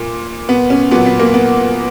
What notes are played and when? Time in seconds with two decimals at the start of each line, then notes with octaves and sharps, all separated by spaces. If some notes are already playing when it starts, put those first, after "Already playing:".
Already playing: A#2
0.49 B3
0.70 C#4
0.91 A#2 F#3 B3
1.06 B3
1.20 A#3
1.34 B3